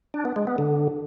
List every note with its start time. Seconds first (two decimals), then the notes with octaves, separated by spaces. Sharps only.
0.14 D4
0.25 B3
0.36 G#3
0.47 B3
0.58 D3